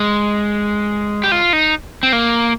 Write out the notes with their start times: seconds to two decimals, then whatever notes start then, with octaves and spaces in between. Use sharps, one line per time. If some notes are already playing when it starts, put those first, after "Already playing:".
Already playing: G#3
1.24 G4
1.32 F4
1.53 D#4
2.03 C4
2.13 A#3